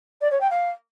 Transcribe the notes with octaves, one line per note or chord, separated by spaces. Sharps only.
D5
C#5
G5
F5